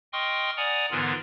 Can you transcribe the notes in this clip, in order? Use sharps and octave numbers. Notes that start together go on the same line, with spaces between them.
D#5 G5 C6 C#6 D#6 F6
D5 F#5 G#5 A#5 D#6
G#2 D3 E3 B3 F4 A#4